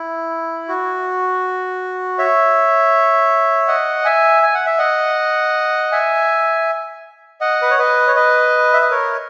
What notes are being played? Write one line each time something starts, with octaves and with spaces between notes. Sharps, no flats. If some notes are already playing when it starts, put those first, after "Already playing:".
Already playing: E4
F#4
C#5 E5
D#5 F#5
E5 G#5
G#5
F#5
E5
D#5 F#5
E5 G#5
D#5 F#5
B4
C#5
B4 D#5
C#5
B4 D#5
E5
D#5
A#4 C#5